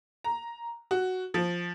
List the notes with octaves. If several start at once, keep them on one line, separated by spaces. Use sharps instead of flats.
A#5
F#4
F3